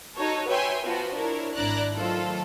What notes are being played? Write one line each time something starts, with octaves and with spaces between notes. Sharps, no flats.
D#4 F#4 A4 C#5
B4 C#5 E5 G5 G#5 C6
F3 B3 F4 F#4
D4 E4 A#4 C#5
G#1 D4 E4 D5 A#5 F#6
D#3 F#3 A3 F4 A4 C5